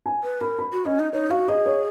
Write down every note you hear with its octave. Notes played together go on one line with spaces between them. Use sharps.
G#5
B4
A#4 B5
B5
F#4
C#4 D#5
D#4
D#4 C#5
F#4 F5
G#4 D#5
C#5